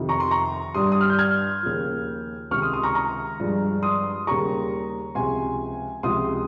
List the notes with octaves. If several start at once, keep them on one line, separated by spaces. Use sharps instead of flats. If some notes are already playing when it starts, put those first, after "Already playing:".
Already playing: F2 C3 D#3
A#5 C#6
C6
A#5 C#6
G2 G3 C6 D#6
D#6
F6
G6
F6 G#6
D#2 C#3 F3
C#2 C3 D#3 G#3 C#6 F6
C6 D#6
C6 D#6
A#5 C#6
A#5 C#6
G2 F3 G#3
C6 D#6
D#2 C#3 G3 A#5 C#6
C#2 C3 F3 G#3 G#5 C6
C#2 C3 F3 G#3 C6 D#6